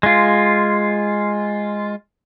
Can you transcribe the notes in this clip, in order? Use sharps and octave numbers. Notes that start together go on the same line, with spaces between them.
G#3 F4